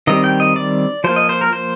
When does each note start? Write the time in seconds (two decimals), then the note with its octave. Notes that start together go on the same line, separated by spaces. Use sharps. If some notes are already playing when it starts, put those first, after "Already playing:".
0.07 D#3 G3 C4 D#5
0.24 G5
0.40 D#5
0.56 D5
1.04 F3 A#3 C5
1.16 D#5
1.29 C5
1.41 A#4
1.53 C5